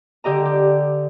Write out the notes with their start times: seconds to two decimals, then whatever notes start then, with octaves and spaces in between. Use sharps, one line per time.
0.24 D3 G4 D#5 A#5
0.45 G4